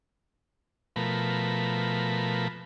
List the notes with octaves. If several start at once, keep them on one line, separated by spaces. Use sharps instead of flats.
B2 F3 A3 A#4 B5